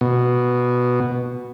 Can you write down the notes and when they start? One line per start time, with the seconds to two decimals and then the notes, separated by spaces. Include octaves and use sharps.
0.01 B2